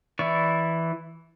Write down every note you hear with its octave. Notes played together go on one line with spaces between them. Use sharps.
E3 E4 D5 C#6